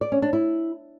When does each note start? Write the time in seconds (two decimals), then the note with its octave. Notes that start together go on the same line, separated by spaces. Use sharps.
0.01 D5
0.12 C#4
0.22 D4
0.33 E4